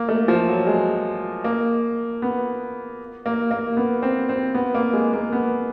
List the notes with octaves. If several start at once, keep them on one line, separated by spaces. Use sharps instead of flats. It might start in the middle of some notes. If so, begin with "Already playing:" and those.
Already playing: A#3
A3
F3
F#3
G#3
A#3
B3
A#3
A#3
B3
C4
C4
B3
A#3
G#3
A#3
B3